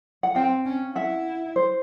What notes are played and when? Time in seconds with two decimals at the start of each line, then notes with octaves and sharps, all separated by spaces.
0.23 F#5
0.35 C4 F5 G5
0.66 C#4
0.95 E4 E5 F#5
1.56 C5